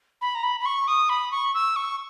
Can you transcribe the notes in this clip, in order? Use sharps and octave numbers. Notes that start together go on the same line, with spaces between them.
B5
A#5
B5
B5
C#6
D#6
B5
C#6
E6
C#6